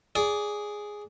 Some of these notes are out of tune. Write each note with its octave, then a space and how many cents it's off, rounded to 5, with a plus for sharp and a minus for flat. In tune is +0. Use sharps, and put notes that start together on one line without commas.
G#4 +0 D5 -20